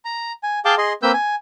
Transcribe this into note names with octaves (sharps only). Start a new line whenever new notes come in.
A#5
G#5
G#4 F5 G5 A5 D6
G#4 D#5 C6
A#3 C4 B4 E6 G6
G#5